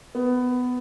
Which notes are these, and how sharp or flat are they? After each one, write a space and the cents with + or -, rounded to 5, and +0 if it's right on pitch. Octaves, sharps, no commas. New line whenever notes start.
B3 +15